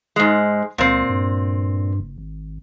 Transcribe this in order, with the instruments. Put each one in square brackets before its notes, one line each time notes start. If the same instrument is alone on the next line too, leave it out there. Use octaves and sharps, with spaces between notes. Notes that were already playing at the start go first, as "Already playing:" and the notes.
[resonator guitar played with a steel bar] G#2 G#3
[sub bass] C#2 [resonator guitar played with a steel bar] A#2 C4
[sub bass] G2
F#1
G#1